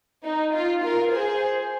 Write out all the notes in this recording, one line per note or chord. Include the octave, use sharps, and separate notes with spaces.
D#4
F4
F4 A#4
G#4 C5